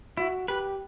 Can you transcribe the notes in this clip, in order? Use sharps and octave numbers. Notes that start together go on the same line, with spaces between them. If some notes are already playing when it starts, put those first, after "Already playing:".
E4 F#4
G4 B4